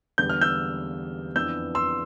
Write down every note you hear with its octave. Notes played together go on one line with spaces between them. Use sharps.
E2 D3 G3 B3 G6
F6
E6 G6
F2 E3 B3 D4 E6 G6
C6 E6